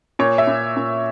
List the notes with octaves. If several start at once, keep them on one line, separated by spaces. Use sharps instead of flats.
A#2 C#5
E5
A#2
A#2